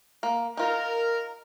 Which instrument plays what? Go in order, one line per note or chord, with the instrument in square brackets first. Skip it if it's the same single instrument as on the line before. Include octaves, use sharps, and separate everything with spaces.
[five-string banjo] A#3
[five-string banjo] D#4 F4 [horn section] A#4